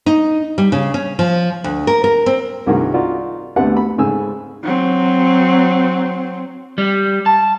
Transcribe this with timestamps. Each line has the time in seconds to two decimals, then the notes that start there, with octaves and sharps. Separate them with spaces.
0.06 D#4
0.58 G3
0.72 C#3
0.94 C#4
1.19 F3
1.64 D2
1.87 A#4
2.04 A#4
2.26 C4
2.66 C2 G2 D#3 F#4 G#4 A#4
2.94 D#4 F4 F#4 D5
3.56 D2 D3 A3 B3 G4 F#5
3.76 B5
3.98 G#2 C#3 G#4 A4 G#5 E6
4.64 F#3 C4
6.78 G3
7.26 A5